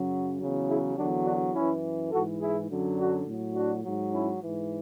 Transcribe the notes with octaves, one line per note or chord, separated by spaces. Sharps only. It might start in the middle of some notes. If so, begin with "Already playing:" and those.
Already playing: F#2 C#3 F#3
E2 C#3 F#3
E4 G#4
E2 D3 F#3 D4 F#4
D4 F#4
F#2 E3 C#4 E4
G#2 E3 F#4 A4
E4 G#4
F#2 D3 F#3
D4 F#4
A2 F#3
D4 F#4
G#2 F#3
C#4 E4
G#2 E3